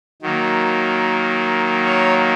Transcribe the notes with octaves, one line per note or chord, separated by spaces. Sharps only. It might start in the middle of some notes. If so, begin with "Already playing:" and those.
D#3 F#3 A#3
C#5